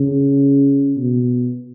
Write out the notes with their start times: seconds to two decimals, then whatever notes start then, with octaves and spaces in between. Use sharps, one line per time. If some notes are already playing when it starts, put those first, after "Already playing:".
Already playing: C#3
0.97 B2